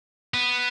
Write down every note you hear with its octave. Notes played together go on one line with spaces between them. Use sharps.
B3